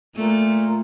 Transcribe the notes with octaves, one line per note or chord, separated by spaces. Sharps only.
A#2 A3